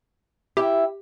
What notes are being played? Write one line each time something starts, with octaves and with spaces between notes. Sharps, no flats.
E4 G4 G5